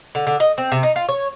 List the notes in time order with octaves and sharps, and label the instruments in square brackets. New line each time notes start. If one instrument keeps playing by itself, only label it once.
[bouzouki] D3
D3
D#5
C4
C3
D#4
F4
C#5